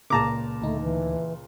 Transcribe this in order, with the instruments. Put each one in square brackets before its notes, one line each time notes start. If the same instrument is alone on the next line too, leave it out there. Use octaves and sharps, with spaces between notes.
[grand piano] C#2 A#2 [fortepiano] A5 A#5 D6
[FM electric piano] D2 D#4 [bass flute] A3
[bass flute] E3